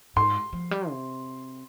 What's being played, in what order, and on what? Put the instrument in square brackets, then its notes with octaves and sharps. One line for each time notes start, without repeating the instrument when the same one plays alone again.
[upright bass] G#2 [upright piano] C6
[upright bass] F3
G3
C3